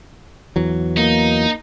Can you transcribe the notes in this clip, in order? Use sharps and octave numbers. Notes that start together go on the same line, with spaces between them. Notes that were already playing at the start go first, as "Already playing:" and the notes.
E2 E3 F#3
A#3 D#4